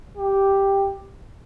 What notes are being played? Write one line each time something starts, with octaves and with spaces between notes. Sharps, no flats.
G4